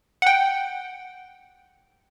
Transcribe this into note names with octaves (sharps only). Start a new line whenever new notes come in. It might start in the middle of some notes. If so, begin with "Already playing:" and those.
F#5 G5